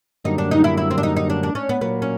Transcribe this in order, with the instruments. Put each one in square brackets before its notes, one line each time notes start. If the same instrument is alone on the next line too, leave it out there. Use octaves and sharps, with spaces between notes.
[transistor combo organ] F#2 D3 G3 A#3 [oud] D#4
[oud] D4
D#4
E4
E4
C4
D4
D#4
D#4
D4
D4
C#4
B3
[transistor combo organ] A#2 F#3 A#3 [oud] B3
[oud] C#4